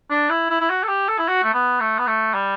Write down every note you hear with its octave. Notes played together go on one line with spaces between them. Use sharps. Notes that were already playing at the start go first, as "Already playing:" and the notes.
D4
E4
E4
E4
F#4
A4
G4
A4
E4
F#4
A3
B3
A3
B3
A3
G3